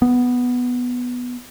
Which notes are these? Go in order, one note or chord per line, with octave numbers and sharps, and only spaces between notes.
B3